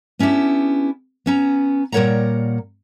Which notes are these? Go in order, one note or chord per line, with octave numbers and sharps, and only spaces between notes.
B3 C#4 D4 E4 G4
B3 C#4 A#5
A#2 G3 A#4 C#5 F#5 A#5